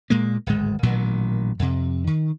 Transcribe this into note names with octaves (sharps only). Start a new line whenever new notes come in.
A#2 G#3 A#3
D1 G#1 G#3
A1 A#2 D#3 F#3
F2 C3
D#3